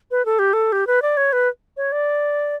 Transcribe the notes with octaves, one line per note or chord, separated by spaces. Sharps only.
B4
A4
G4
A4
G4
B4
D5
C#5
B4
C#5
D5